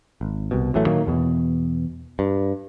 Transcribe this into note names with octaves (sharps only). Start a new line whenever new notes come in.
G#1
C2 B2
A1 E3 F#3 A3
A#2 D#3 F#3 A#3
E2 B2
G2